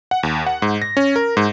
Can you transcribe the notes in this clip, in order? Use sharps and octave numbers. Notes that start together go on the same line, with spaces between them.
F#5
D#2
F#5
G#2
A#6
C#4
A#4
G#2